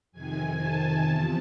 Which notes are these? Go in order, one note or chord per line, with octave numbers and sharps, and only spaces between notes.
F2 C3 D#3 G#5
A5
E2 C3 F3